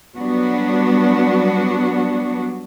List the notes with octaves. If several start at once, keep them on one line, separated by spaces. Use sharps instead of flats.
F#3 G3 B3 D4 F#4